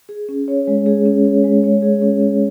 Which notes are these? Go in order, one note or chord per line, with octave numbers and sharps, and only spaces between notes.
G#4
C#4
C#5
G#3
G#4
C#4
C#5
G#3
C#5
G#4
C#4
C#4